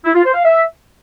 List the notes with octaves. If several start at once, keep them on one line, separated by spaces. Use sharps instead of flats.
E4
F4
C5
F5
E5